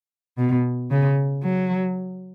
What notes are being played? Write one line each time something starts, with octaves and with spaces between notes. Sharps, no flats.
B2
C#3
F#3